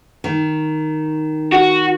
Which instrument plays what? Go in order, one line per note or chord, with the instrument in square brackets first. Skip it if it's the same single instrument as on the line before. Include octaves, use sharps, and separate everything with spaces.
[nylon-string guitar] D#3
[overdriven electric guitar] F#4